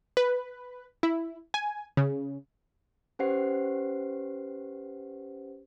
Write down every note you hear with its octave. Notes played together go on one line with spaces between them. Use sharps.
B4
E4
G#5
C#3
C#4 G4 B4 C5 F#5 C7